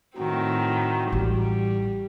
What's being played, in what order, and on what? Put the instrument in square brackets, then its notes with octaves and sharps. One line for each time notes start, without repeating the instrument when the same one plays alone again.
[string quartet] A2 D#3 C4 [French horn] F#4
[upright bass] A1 [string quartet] G3